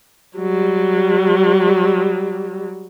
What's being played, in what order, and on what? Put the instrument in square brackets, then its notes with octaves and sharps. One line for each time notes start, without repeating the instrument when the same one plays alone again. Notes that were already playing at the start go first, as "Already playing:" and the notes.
[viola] F#3 G3